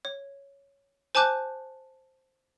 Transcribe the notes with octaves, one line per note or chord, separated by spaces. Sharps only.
C#5
C5 G#5 A5 D6 F#6 G6